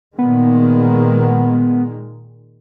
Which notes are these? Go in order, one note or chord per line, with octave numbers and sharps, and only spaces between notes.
A#2 D#3 G#3 B3